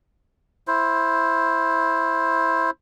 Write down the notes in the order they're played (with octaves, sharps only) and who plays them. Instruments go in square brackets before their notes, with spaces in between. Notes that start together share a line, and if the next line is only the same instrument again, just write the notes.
[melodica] E4 C5